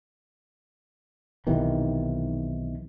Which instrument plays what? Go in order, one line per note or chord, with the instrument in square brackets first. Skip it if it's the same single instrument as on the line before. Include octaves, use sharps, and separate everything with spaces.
[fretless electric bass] B1 C3 D#3 E3